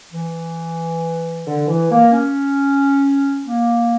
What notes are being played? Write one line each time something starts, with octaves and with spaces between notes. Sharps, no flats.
E3
D3
E3
A#3
C#4
A#3